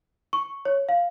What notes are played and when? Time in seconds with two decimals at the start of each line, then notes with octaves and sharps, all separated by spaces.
0.33 C#6
0.65 C#5
0.89 F5